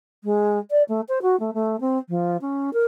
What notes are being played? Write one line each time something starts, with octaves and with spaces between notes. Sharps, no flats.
G#3
D5
A3
C5
F#4
A3
A3
C4
F3
C#4
A#4